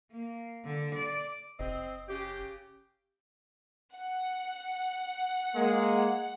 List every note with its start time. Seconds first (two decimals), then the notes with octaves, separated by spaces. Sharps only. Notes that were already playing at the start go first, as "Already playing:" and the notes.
0.11 A#3
0.65 D3
0.95 D5
1.60 F#1 C4 D#5
2.09 C#3 G4
3.93 F#5
5.55 G#3 A#3